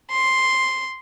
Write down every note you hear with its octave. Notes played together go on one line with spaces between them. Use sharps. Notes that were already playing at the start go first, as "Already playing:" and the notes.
C6